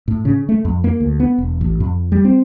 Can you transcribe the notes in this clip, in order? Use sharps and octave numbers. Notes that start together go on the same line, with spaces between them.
A2
C#3
A3
F2
A#3
D2
B3
E1
A1
F2
G3
C4